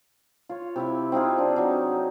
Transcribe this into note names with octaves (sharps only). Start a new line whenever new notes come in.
F4 C#5
C3 E4 E5
C4 D#4 F4 G#4
D4
F#3 D#4